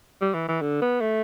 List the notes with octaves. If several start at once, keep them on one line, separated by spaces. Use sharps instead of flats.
G3
E3
E3
D3
B3
A3